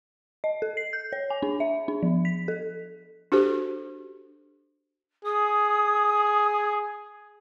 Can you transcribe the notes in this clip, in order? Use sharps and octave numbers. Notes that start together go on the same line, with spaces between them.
D#5
A4
C7
G6
C#5
G#5
D4
E5
D4
F3
B6
A4
D4 F#4 G4 A4 C5
G#4 D#6